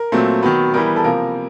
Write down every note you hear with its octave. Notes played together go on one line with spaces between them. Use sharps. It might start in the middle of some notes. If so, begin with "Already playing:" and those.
Already playing: A#4
A#2 F#3 A3 C4
D#3 F#3 B3
E3 G3 B3 A#4
A4
C3 F3 A#3 A#4